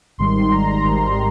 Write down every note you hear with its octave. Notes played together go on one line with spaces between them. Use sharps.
G#1 G#2 D#3 G3 C6
A#5
G#1 G#2 D#3 G3